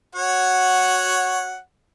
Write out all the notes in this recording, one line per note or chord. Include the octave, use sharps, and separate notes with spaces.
F#4 C#5 F#5